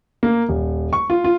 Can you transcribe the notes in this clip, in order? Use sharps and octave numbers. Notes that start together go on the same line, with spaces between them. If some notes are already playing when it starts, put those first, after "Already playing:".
A#3
D#1
C#6
F4
F4